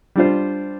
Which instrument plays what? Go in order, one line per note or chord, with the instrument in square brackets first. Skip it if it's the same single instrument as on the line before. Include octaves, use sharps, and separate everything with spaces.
[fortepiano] G3 D4 F4 C5